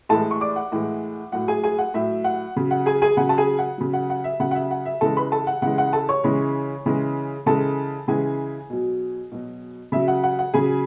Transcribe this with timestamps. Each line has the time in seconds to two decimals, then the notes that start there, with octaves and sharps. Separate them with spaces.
0.09 A2 E3 G#3 A4 A5
0.31 C#6
0.41 D5 D6
0.56 F#5
0.72 A2 E3 G#3
1.32 A2 F#3 F#5
1.48 G#4 G#5
1.64 G#4 G#5
1.78 F#5
1.94 A2 F#3 E5
2.24 F#5
2.56 C#3 F#3
2.71 F#5
2.86 G#4 G#5
3.02 G#4 G#5
3.17 C#3 F#3 F#5
3.29 A5
3.38 G#4 G#5
3.59 F#5
3.78 C#3 F#3
3.93 F#5
4.10 F#5
4.24 E5
4.40 C#3 F#3 F#5
4.51 F#5
4.55 E5
4.71 F#5
4.85 E5
5.01 C#3 E3 G#3 A4 A5
5.16 B4 B5
5.32 A4 A5
5.47 F#5
5.62 C#3 E3 G#3 F#5
5.78 F#5
5.93 A4 A5
6.09 C#5 C#6
6.24 C#3 E3 G#3
6.86 C#3 E3 G#3
7.46 C#3 E3 G#3 A4 A5
8.08 C#3 E3 G#3 G#4 G#5
8.70 B2 F#3
9.32 B2 F#3
9.92 C#3 F#3 E5
10.08 F#5
10.24 F#5
10.39 F#5
10.54 C#3 F#3 G#4 G#5